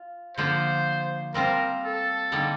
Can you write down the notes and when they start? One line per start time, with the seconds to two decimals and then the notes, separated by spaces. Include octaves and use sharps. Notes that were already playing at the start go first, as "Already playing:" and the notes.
Already playing: F4
0.37 D3 F3 A#3 F4 C5
1.34 G3 C4 F4 A#4 C5
1.83 A4
2.32 D3 G3 A#3 D#4